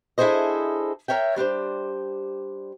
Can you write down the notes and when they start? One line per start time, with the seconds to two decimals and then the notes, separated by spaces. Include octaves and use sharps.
0.18 D4 E4 G#4 A4 C5 D#5
1.08 A#4 C#5 E5 G5
1.36 G3 D4 G4 C5